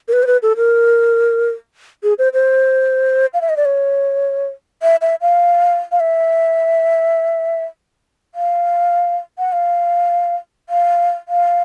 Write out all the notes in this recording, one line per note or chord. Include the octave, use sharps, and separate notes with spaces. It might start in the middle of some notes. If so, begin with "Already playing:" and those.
A#4
B4
C5
B4
A4
A#4
G#4
C5
C5
F5
E5
D#5
D5
C#5
E5
E5
F5
F5
E5
F5
F#5
F5
F5
F5